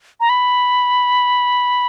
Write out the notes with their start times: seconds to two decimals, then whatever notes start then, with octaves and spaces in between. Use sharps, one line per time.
0.20 A#5
0.29 B5